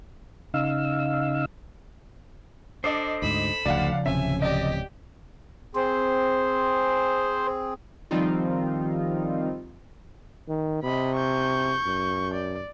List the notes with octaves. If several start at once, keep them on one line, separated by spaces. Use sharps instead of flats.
C#3 D#4 F5 E6
D4 A4 C5 D#5 D6 D#6
D2 G#2 B5 E7
D1 A1 D2 C#3 F3 D5 F5 F#5
D1 C3 C#4 E5 G#5
G4 D5 D#5
C4 G#4 C5
D#3 F3 G3 C4 D#4 F4
D#3
C3 D#5 B5
C#6 G6
F#2
D5